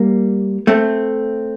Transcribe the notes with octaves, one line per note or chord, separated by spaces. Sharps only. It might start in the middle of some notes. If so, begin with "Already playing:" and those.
Already playing: G3 A#3
A3 C4